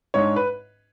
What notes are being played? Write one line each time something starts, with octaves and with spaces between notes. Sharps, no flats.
G#2 G#3 D4 C#5
B4